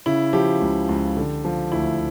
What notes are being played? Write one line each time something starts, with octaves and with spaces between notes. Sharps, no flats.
C#3 E4
F3 G4
C#2
C#2
D3
F3
D2 E4